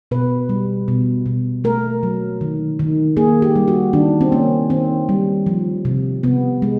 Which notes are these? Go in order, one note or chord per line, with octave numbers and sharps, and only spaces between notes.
B2 B4
G3
B2
B2
A3 A#4
F#3
D#3
D#3
A#3 G#4
G4
G3
F#4
D#3 D4
C4
A#3 C#4
D#3 C4
G3
F3
C3
C3 B3
G#3